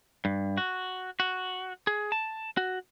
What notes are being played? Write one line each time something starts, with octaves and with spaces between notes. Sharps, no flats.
G2
F#4
F#4
G#4
A5
F#4